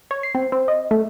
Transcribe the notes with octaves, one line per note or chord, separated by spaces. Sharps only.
C#5
C7
C4
C4
D#5
A3